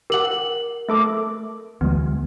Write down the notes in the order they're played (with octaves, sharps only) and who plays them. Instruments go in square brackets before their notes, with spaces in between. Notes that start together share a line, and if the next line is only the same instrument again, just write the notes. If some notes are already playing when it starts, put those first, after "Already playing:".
[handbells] G4 F#5 [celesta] A#4 F#7
[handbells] A3 A4 D6
[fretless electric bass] D2 E3 G#3 [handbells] B3